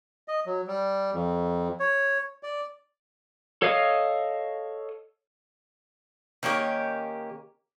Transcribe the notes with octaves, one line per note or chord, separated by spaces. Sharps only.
D#5
F#3
G3
F2
C#5
D5
A4 C#5 D#5 F5 D#6
D#3 A#3 C#4 G4